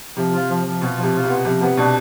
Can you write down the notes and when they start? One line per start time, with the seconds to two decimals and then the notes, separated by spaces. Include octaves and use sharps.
0.17 C3 F3
0.33 F4
0.49 F3
0.65 F3
0.81 B2 F4
0.97 F3
1.03 C3
1.14 F4
1.24 C3
1.29 B3
1.45 C3 F3
1.61 C3 B3
1.77 B2 D4